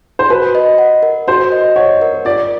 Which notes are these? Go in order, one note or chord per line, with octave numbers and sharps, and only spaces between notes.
C5
F#4 B4
D#5
F#5
A#4
F#4 C5
D#5
C#5 F#5
A#4
F4 D5